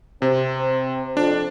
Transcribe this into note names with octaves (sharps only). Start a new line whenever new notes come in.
C3 C4
F2 D4